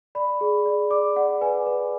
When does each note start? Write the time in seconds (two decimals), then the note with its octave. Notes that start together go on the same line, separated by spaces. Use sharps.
0.15 D5 B5
0.41 G#4
0.66 D5
0.90 D5 D6
1.16 D5 F#5
1.41 B4 G#5
1.66 B4